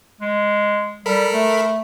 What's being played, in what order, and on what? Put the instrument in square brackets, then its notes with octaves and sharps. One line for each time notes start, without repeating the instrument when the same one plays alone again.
[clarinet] G#3
[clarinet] G3 [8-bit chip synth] A4 A#4 B5
[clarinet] A3